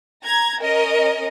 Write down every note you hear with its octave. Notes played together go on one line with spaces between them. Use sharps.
A#5 G#6
C#4 A#4 D#5